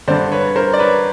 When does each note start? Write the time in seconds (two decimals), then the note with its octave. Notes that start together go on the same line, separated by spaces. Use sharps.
0.08 G2 D3 C5 D5
0.32 B4 C#5
0.56 A#4 C5
0.74 D5
0.79 B4 C#5